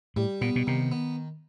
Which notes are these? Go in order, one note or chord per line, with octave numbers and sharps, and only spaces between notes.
A2 G3
A#2 B3
B2
C3 D#3
B3